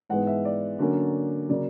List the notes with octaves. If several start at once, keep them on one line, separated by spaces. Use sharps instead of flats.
G#2 E3 G#3 B3 F#5
E5
D5
D3 F#3 A#3 C#4
C#3 F#3 A#3 D5